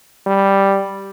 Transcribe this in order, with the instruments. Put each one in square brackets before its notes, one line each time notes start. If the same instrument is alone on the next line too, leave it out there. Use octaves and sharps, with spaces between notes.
[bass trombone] G3